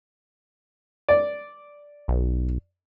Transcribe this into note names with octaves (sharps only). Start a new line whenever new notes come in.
D5
B1